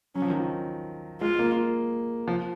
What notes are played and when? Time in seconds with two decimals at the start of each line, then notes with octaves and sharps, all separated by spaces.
0.15 F#3 C#4
0.22 F3
0.30 D#3
0.39 F3
1.21 G#3 F4
1.39 A#3
2.28 F3